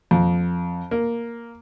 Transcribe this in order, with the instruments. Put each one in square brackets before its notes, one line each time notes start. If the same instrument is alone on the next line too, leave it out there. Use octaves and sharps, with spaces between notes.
[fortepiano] F2
A#3